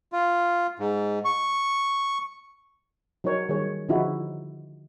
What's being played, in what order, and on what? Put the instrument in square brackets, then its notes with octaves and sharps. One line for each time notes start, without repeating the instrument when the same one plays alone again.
[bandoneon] F4
G#2
C#6
[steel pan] F#3 D#4 A#4 C#5
D#3 G3 G#4 C#5
D3 F3 D#4 E4 F#4 G#4